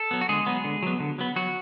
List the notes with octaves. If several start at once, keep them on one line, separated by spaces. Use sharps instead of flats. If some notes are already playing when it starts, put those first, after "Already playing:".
Already playing: A4
F#3 B3
F#4
D3 G#3 G#4
F#3 B3
D3
F#3 B3
D3
F#3 B3
F#3 F#4